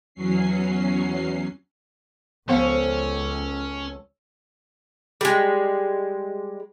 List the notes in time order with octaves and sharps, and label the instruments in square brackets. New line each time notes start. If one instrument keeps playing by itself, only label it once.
[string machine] E2 F#3 C#4 C7
[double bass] C#2 [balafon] F3 B3 F5 [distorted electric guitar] C#4 [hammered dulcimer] A4 C5 C#5
[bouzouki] G3 G#3